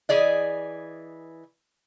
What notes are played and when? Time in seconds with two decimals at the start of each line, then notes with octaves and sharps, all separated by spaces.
0.09 E3 G#4 D5 D#5